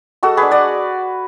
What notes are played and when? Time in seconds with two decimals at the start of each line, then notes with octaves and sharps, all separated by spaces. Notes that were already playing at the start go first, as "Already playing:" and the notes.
0.23 G#3 F#4 A4
0.37 D4 G#4 B4
0.51 D5 F#5